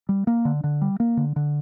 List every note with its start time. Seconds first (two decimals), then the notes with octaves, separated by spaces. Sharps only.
0.09 G3
0.27 A#3
0.45 D3
0.64 D3
0.82 G3
1.00 A#3
1.17 D3
1.36 D3